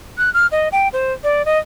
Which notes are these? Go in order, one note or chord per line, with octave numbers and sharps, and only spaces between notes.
F#6
F6
D#5
G5
C5
D5
D#5